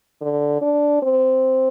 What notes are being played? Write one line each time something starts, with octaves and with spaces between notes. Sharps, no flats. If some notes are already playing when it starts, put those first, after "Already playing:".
D3
D4
C4